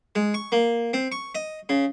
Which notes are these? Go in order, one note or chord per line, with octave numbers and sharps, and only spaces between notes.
G#3
C#6
A#3
C4
C#6
D#5
C#3